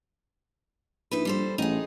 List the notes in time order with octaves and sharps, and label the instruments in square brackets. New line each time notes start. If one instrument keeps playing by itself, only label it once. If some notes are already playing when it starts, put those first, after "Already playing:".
[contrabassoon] A#1 [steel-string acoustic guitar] D#4 E4 B4
[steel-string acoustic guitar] G3 A4 C5
[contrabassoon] A1 [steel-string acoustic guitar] D#4 G#4